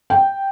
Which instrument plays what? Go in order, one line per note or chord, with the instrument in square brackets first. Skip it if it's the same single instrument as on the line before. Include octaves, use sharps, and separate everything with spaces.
[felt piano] G5